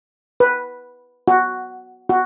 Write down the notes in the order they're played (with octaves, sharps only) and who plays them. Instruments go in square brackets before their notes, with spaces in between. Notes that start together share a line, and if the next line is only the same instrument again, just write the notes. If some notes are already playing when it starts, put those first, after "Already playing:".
[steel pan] B4
F#4
F#4